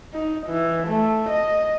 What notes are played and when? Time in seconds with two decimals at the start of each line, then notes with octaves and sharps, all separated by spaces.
0.14 D#4
0.47 E3
0.88 A3
1.29 D#5